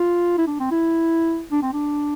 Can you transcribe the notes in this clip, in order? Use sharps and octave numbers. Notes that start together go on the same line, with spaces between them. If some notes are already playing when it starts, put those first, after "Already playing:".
Already playing: F4
E4
D4
C4
E4
D4
C4
D4